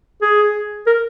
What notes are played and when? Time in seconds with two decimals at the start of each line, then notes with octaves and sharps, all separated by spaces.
0.22 G#4
0.87 A#4